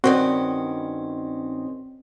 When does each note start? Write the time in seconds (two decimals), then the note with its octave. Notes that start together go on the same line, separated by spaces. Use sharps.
0.04 G2 D#3 C4 C#4 F#4